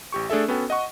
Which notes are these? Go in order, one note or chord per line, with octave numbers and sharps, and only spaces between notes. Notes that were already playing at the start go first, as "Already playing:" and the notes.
A1 G4 C#6
A3 D4 G#4 A4 E5
B3 C#4 F#4 A4 G5
D#5 F#5 C#6